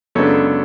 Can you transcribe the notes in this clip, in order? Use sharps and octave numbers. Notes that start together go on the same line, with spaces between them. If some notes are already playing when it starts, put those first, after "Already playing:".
F#2 C#3 G#3 B3 D4 A4 C#5